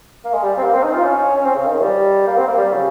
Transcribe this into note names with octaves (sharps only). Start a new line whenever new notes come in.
A#3
G#3
G3
C4
A#3
C4
D#4
F4
C#4
C#4
C4
C#3
D#3
G3
A#3
C4
A#3
G3
C#3